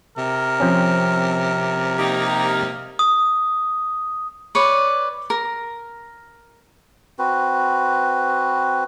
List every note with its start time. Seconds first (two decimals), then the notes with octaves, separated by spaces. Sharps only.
0.17 C3 A#4
0.60 F3 C4 C#4
1.98 A#3 D#4 G4
2.99 D#6
4.55 B4 C#5 D5
5.30 A#4
7.19 C4 F#4 B4